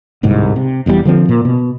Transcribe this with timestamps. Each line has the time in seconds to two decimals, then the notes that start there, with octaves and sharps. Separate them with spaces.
0.23 D1 C2 G#2
0.56 C3
0.86 E1 E2 G2 G3
1.05 D3 F3 G3 C4
1.29 A#2
1.45 B2